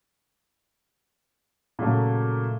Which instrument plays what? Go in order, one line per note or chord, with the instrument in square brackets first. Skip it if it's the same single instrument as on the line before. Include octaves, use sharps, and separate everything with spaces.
[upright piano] A#2 C#3 F#3 A3